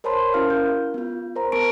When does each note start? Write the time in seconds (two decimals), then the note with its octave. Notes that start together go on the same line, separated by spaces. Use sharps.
0.04 A#4 C5 C#5 A5 B5 C6
0.34 C#4 E4 F#4 A#4 F5 F6
0.50 G6
0.94 B3 F4
1.36 A#4 C5 A#5
1.52 B3 A#4 A5 C#6 D7